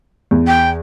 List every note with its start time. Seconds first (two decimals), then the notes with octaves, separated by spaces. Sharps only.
0.31 E2
0.47 G5